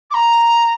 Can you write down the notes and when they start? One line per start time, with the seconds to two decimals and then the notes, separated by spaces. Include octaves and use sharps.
0.10 D6
0.14 A#5